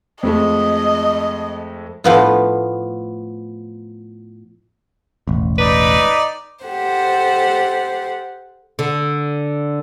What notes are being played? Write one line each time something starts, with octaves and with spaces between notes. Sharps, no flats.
F2 G#3 A3 D#5
A2 F3 B3 F4
E1 A1
D#4 B4 D5
G4 A4 C5 F#5
D3